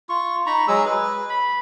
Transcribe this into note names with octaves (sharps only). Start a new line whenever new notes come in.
F4 C#6
D#4 A#5 B5 C#6
F#3 G#3 G#4 E6
B4
B5